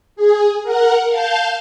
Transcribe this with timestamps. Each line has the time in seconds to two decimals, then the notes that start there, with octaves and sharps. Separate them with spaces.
0.16 G#4
0.63 A#4 F#5
1.09 F5 A5 G6